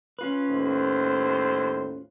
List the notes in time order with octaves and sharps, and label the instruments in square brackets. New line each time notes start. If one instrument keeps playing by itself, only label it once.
[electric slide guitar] C#4 F4 B4
[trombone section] D#2 A2 C5